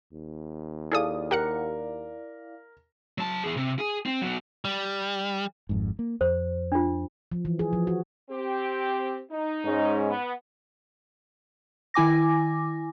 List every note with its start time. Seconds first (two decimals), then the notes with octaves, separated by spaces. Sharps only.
0.13 D#2
0.92 E4 G#4 A4 D5 F5 D#6
1.31 G4 A#4 F#5 C#7
3.18 F#3 A5
3.44 E2 G#4
3.57 C3
3.79 G#4
4.06 C4
4.22 F#3 B3
4.65 G3
5.69 G#1 F2 G#2
5.99 A#3
6.21 F2 C5
6.72 D4 F4
7.32 F3
7.45 E3
7.59 G#4
7.73 F3
7.87 F#4
8.30 C4 G4
9.31 D#4
9.64 G#2 G#3 C#4
10.08 B3
11.94 D#3 E4 G#5 D6 A#6